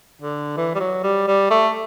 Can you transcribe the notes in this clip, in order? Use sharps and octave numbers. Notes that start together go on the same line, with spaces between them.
D3
E3
G3
F#3
G3
G3
A3